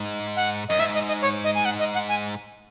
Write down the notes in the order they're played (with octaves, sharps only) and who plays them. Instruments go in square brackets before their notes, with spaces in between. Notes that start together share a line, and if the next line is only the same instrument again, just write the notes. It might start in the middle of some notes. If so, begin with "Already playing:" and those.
Already playing: [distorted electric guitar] G#2
[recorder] F#5
[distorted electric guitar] F#2 [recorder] D#5
[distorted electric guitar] G#2 [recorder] E5
[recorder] D#5
D#5
C#5
D#5
G#5
F#5
D#5
F#5
G#5